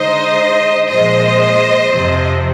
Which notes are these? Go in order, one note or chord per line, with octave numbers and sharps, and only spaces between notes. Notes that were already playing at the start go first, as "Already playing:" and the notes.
Already playing: D3 G#3 D#4 C5 D#5
A#2 F3 G#3 C5 D#5
F2 C3 F3 C4